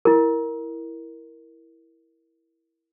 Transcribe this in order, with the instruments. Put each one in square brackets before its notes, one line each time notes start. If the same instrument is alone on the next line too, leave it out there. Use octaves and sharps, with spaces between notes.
[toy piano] E4 A#4